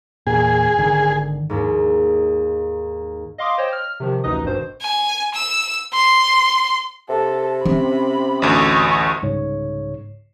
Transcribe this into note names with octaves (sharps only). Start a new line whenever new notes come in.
E2 A#2 G#4
G#1 D3 D#3
D#2 G#2
D#5 F5 C6 D6 D#6
C5 C#5 D#5 G5
F6
C3 D#3 F3
A1 D2 D#4 B4 D#5 D#6
G#1 G2 B2 C5
G#5
E6
C6
C3 A4
C4 C#4 B5
A1 D2 C#6 D#6
C2 G#2 C#3 C#5